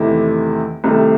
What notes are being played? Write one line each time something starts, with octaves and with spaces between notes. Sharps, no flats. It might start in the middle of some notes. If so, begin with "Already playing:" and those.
Already playing: E2 C3 D#3 A3 E4
C2 C3 D#3 A3